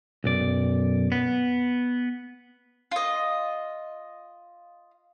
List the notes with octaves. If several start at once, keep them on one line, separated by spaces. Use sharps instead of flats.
B1 F#2 D5
B3
F4 D#5